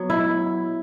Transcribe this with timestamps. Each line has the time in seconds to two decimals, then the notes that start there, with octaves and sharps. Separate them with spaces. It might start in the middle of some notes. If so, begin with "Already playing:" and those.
Already playing: F#3 B3
0.10 E4